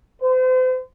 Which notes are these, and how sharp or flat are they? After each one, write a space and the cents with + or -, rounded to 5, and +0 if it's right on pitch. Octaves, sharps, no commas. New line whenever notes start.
C5 -40